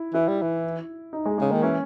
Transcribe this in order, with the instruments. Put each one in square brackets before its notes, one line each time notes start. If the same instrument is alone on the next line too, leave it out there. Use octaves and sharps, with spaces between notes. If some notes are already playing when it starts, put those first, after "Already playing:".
Already playing: [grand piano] E4
[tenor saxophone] E3 [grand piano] E4
[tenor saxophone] G3
E3
[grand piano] D#4
G#3
[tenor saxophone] C#3 [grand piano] G#3
[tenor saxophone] D#3 [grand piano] A#3
[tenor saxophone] E3 [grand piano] C#4